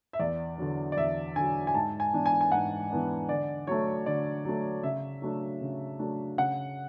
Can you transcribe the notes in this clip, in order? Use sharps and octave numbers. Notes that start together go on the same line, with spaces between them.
E5
E2 D5
D3 F#3
D5
E2 E5
D3 F#3 G#5
G#5
G#2 A5
G#5
E3 B3 D4
G#5
G#5
G#2 F#5
E3 B3 D4
D3 D5
F#3 A3 C#5
D3 D5
F#3 A3
C#3 E5
F#3 A3 D4
C#3
F#3 A3 D4
C#3 F#5